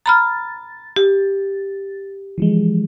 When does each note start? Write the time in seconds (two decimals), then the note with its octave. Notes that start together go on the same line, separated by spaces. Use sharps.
0.06 A#5 B5 F6 A6
0.96 G4
2.38 E3 F3 G#3